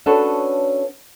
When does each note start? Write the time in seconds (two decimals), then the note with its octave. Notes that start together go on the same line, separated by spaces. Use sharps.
0.06 C#4 D4 F#4 A4 B4 C#5